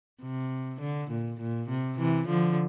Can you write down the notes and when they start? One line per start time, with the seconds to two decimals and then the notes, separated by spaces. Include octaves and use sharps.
0.21 C3
0.81 D3
1.10 A#2
1.40 A#2
1.69 C3
1.98 C3 E3
2.28 D3 F3